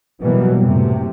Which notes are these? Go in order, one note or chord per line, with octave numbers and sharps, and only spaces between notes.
B2 E3 F#3 G3 A#3 B3
F#2 A2 C3